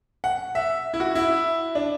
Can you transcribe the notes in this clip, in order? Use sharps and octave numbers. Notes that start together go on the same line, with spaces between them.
F#5
E5
E4
F#4
E4
D4